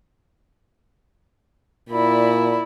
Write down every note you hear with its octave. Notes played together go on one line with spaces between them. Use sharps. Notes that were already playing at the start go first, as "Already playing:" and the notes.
A#2 E4 D5 B5